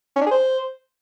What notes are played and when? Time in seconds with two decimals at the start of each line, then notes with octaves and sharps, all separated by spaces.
0.16 C#4
0.21 D4
0.26 G#4
0.31 C5